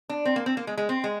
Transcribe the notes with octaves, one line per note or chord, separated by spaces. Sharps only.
D4
C4
A#3
C4
A#3
G#3
G#3
C4
G#3